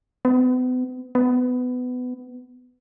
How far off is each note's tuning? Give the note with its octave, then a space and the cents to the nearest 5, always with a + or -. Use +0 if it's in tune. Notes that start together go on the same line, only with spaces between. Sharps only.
B3 +40
B3 +20